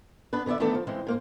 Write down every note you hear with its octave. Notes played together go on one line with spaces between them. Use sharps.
B3 D4 B4
D3 B3 G#4 D5 E5
D#3 E3 A3 B3 D4 A4
F3
C#3 E3 G#3 C4
G#2 A#3 C5